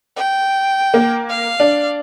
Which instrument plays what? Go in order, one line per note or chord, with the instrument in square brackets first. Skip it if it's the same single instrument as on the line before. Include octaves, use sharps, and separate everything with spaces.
[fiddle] G5
[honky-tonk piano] A#3
[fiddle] F5
[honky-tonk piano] D4